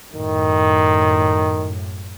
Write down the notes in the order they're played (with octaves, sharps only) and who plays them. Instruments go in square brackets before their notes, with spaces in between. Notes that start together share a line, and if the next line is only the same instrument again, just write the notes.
[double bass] F#2 A2 [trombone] D#3